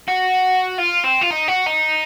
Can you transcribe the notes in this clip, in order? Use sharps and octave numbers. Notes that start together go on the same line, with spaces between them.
F#4
F4
C4
F4
D#4
F#4
D#4